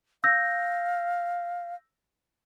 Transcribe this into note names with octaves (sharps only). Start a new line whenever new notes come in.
F5 E6 G6 A#6